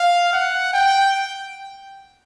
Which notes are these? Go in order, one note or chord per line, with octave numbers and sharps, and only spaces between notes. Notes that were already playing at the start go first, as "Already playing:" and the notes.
Already playing: F5
F#5
G5